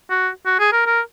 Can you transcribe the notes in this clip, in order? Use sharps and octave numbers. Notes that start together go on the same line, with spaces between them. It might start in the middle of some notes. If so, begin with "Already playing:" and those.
F#4
F#4
G#4
A#4
A#4